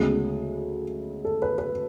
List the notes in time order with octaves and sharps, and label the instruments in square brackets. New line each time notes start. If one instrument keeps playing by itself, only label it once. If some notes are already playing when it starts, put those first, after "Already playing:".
Already playing: [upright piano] D2 C#3 G#3 B3 G#4
A4
B4
B4